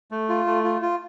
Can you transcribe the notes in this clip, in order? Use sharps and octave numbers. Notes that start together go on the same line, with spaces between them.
A3
F4
A3
F4
F4